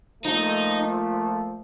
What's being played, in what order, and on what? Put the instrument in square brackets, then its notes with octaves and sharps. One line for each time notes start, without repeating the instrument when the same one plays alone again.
[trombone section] A#2 F3 A3 [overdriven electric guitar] D#4